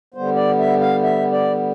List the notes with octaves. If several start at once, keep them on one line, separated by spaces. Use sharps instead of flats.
D3 G3 B3 C5
D5
E5
F5
E5
D5